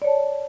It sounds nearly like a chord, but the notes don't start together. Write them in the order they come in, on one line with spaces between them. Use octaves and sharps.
D5 C#5 A5